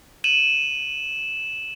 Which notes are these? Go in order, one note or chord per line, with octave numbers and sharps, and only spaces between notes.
D#7 E7 F#7